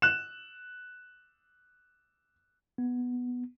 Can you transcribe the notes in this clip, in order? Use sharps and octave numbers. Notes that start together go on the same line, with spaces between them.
F#6 E7
B3